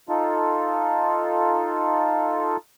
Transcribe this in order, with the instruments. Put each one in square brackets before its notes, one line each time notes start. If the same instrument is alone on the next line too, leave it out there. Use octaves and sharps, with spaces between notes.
[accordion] D#4 F4 A4